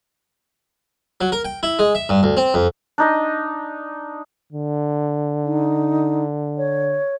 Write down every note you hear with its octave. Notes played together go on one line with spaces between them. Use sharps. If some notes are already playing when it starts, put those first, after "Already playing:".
F#3
A#4
G5
E4
G#3
E5
G2
D2
C4
F2
D4 D#4 D#5
D3
D#4
C#5